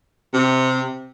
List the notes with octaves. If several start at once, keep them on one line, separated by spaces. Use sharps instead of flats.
C3